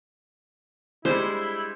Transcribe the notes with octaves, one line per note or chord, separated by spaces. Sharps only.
G3 G#3 D4 E4 C5